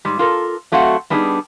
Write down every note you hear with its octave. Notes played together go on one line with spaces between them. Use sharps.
G#2 G3
F4 A4 A#4
F#3 A3 C4 F#4 F5 F#5
G3 B3 D4 D#4 F4 G#4